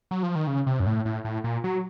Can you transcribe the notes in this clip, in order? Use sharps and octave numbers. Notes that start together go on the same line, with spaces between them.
F#3
F3
D#3
C#3
C3
F#2
A2
A2
A2
A#2
F#3